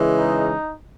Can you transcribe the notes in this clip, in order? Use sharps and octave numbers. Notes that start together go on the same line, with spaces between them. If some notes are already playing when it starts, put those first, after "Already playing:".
Already playing: C#3 E3 G#3
D#4